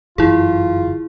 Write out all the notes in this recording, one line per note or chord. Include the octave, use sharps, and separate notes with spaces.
G1 F#2 E3 E4 F4 G#4